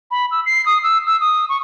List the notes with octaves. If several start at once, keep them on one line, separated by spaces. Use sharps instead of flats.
B5
E6
C7
D#6
E6
E6
D#6
C#6